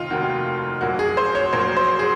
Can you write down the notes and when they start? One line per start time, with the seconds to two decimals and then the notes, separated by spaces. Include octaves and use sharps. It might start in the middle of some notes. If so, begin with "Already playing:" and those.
Already playing: F1 D#2 D#3 D#4 F4
0.10 F1 D#2 D#3 F#4
0.81 A#1 A#2 F#3 A#3 F#4
0.99 G#4
1.17 C5
1.35 C#5
1.53 A#1 A#2 F#3 A#3 C5
1.77 C5
1.99 G#4